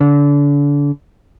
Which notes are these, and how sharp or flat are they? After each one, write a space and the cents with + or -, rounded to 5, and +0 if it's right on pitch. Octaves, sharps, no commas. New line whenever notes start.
D3 -30